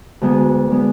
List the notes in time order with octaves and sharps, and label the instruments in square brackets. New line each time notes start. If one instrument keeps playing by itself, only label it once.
[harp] D2 D3 G#3 B3
D3 G#3 B3